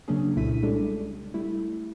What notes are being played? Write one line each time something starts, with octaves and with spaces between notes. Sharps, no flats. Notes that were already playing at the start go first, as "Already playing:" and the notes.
C#3 F#3 A#3 C#4 D4 G#4
C2 A#2 A3 E4 B6 D#7
G3 G#3 C#4 D4 A4
G3 A3 E4